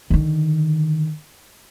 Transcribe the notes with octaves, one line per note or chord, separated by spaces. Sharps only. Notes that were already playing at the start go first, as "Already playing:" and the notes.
D3 D#3